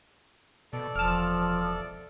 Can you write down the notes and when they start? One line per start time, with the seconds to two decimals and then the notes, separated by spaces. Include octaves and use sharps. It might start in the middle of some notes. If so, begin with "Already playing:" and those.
0.73 B2 A4 D5
0.96 E1 F3 A5 F6